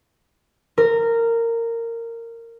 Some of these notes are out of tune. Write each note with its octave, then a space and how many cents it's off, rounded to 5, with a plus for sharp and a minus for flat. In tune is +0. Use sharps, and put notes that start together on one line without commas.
A#4 -15